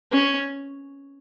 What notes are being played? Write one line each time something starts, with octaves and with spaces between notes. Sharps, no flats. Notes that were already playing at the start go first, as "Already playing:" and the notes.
C#4